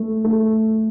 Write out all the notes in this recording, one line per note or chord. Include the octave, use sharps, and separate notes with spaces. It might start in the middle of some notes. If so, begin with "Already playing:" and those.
Already playing: A3
A3